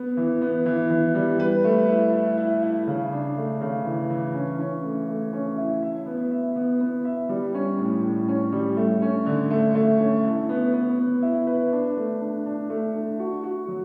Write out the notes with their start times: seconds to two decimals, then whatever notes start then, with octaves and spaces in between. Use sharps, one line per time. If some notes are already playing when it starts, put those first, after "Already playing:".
Already playing: B3
0.17 E3
0.41 B3
0.66 E3
0.90 E3
1.15 G3
1.40 B4
1.64 A3
1.88 E4
2.13 E4
2.38 E4
2.63 E4
2.87 C#3
3.12 D4
3.37 A3
3.61 C#3
3.85 E3
4.10 E3
4.35 C#4
4.59 C#4
4.84 A3
5.08 A3
5.33 C#4
5.58 E4
5.82 E5
6.06 B3
6.31 E5
6.56 B3
6.80 B3
7.05 E5
7.29 G3
7.54 C#4
7.78 A2
8.03 A2
8.28 C#4
8.52 G3
8.77 A3
9.02 C#4
9.26 D3
9.50 A3
9.75 A3
10.00 C#4
10.24 E4
10.49 B3
10.73 B3
10.99 B3
11.22 E4
11.47 B4
11.72 D4
11.97 A3
12.21 D4
12.46 D4
12.70 A3
12.95 D4
13.19 F#4
13.43 F#4
13.68 F#3